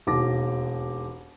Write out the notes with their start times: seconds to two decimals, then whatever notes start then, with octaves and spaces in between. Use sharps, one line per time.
0.07 E1 D#2 D6 A#6